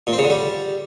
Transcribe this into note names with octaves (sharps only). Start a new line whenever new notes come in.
A#2
C4
C#3
D3
G3